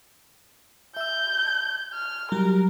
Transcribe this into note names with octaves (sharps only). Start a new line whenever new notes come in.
E5 E6 G6
A5 G#6
F6
F#3 G3 G4 A#4